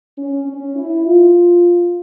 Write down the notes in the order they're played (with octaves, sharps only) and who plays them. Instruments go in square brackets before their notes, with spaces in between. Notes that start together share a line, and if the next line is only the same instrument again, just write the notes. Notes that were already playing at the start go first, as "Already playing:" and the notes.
[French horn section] C#4
C#4
E4
F4